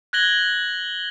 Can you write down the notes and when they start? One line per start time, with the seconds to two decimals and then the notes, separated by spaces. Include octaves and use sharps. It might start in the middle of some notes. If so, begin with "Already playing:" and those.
0.13 F#6 G#6 A#6 F#7 G7